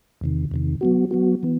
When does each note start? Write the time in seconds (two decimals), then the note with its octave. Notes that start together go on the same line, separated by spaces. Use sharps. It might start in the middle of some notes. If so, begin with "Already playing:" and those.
0.21 E2 C3 D#3
0.51 E2 C3 D#3
0.81 F#3 B3 F#4
1.11 F#3 B3 F#4
1.43 E3 B3